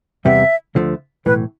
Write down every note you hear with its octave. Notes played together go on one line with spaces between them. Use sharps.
E2 C3 G3 B3 E5
D2 D3 F3 A3
B1 A2 E3 B4